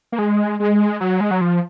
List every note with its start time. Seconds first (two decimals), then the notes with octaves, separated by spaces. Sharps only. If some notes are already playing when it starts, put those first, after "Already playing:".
0.12 A#3
0.19 G#3
0.60 G#3
1.00 F#3
1.21 G#3
1.31 F#3
1.41 F3